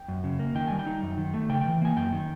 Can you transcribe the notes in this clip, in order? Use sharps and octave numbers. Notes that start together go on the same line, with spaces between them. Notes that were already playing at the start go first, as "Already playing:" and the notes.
Already playing: G5
F#2
C#3
A#3
D#3 G5
G3 G#5
G5
D#4
F#2
D#3
A3
C#3 G5
E3 G5
A#3 G#5
F#2 G5
D#3